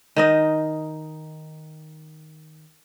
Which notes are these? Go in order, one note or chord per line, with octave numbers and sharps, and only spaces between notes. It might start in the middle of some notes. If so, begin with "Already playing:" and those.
D#3 D#4 D#5